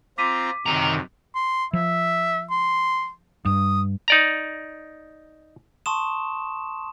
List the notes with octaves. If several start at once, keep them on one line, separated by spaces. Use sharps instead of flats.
C4 F4 A#5 D6 B6 D#7
F#2 C3 D#3 A#5
C6
F3 E5
C6
G2 D#6
D#4 D5 A#5
A5 C6 C#6 D#6 E7